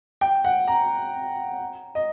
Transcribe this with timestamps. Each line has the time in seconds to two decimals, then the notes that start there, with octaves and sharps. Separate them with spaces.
0.21 G5
0.44 F#5
0.67 A#5
1.95 D#5